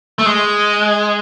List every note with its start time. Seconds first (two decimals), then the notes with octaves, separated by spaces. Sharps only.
0.19 A3
0.26 G#3